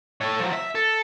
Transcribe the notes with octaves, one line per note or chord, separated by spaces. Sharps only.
A4 C#5
F3 F#3
E5
A4